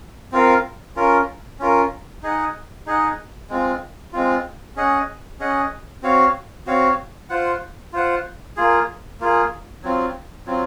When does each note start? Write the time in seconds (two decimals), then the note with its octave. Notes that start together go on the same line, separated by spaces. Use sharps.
0.32 C4 F4 A#4 F5
0.96 C#4 F4 A#4
1.59 C#4 F4 A#4
2.23 D#4 G#4 D#5 F#5
2.86 D#4 G#4 D#5 F#5
3.50 G#3 C4 F4
4.13 G#3 C4 F4
4.76 C#4 G#4 D#5 F#5
5.40 C#4 G#4 D#5 F#5
6.02 C4 F#4 C#5 F5
6.67 C4 F#4 C#5 F5
7.30 F4 C5 F#5
7.93 F4 C5 F#5
8.57 A#3 F4 G#4
9.20 A#3 F4 G#4
9.83 F#3 C4 F4
10.47 F#3 C4 F4